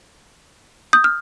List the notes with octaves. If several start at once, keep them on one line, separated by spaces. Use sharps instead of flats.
D#6 G6
F6